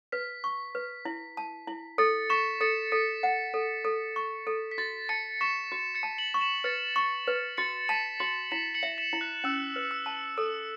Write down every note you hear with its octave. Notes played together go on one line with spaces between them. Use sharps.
B4 B6
C#6
B4
E4
A5
E4
A4 A6 C#7
C#6 B6 E7
A4 A6 C#7
A4 B6
F#5
A4
A4
C#6
A4
B6
F#4 A6
A5 A6 C#7
C#6 B6 E7
F#4
A6 C#7
A5
C#7 F#7
C#6
B6 E7
B4 A6 C#7
C#6
B4
F#4 A6 C#7
A5 B6 E7
F#4 C#7 F#7
E4 B6 E7
C#7 F#7
E5
B6 E7
E4
F#6
C#4 E6
B4
E6
A5
A4 E6